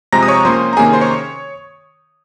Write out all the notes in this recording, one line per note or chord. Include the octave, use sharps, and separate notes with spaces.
C3 F3 G#3 C4 A#5 A#6
D#6
C#5 C#6
F3 A#3 C#4 C5 C6
A#5
C3 D#3 A#3 C#4 G#4 G#5
C5 C6
C#5 C#6